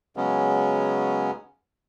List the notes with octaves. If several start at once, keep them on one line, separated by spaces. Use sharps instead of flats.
C#3 F#3 G#3 B3 C#4